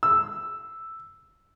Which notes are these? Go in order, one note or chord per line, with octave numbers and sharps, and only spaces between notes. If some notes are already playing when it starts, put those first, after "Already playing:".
E6